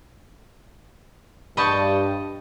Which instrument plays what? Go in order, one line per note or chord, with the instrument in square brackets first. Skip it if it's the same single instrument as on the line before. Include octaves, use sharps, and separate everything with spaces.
[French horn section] G2 [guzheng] D#5 G5 A5 [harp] B5 C#6